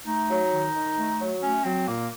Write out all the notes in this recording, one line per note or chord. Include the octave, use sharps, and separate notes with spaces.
A3 D#4
F#3
D#3
D#3
A3
F#3
A3 C#4
F#3 C4
A#2 A#3